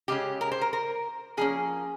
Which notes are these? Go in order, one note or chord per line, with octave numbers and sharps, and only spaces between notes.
C#3 G#3 C#4 G4
A#4
C5
A#4
A#4
F3 A#3 C#4 G#4